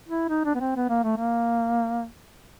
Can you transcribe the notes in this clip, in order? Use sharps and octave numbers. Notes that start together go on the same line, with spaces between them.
E4
D#4
D4
B3
C4
B3
A#3
A3
A#3